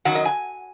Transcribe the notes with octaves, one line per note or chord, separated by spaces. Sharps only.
F#2 D#3 F#3 F#5
D#5
G#5